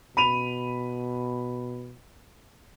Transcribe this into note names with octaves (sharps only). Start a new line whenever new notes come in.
B2 B5 D#7 F7